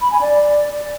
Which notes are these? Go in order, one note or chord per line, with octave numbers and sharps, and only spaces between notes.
B5
G#5
D5